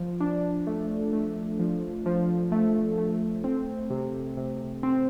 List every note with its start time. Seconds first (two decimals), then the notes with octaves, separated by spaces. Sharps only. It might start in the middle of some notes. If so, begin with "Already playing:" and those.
Already playing: F3
0.20 D4
0.67 A3
1.13 A3
1.59 F3
2.06 F3
2.52 A3
2.98 A3
3.44 C4
3.90 C3
4.37 C3
4.83 C4